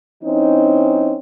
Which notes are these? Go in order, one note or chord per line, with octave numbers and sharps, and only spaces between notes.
E3 C4 C#4 D#4